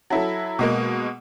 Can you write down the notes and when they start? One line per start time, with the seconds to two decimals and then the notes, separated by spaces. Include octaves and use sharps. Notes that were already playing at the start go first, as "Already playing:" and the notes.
0.10 F#3 E4 A4
0.59 B2 G#3 A#3